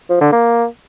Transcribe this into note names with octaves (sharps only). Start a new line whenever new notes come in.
F3
D3
A#3